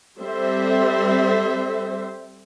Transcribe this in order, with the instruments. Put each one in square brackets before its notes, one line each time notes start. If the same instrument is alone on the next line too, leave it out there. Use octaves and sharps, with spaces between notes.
[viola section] G3 C4 A4 C5 E5